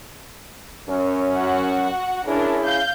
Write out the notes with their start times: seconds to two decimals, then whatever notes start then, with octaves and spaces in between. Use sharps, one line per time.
0.90 F#2 C#4
1.35 F#4 F#5
2.27 C#4 D4 E4 G#4 A#4
2.63 F5 G6